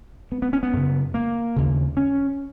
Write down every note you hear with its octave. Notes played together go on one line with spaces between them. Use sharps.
B3
B3
C#4
B3
F#2 C#3
A#3
D#2 C#3
C#4